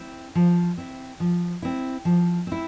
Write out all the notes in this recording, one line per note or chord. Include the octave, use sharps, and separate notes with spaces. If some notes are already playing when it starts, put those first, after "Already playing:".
Already playing: C4 E4
F3
C4 E4
F3
C4 E4
F3
C4 E4